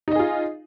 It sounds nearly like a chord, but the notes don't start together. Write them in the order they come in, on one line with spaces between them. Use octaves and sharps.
D#4 D#5 G#4 F4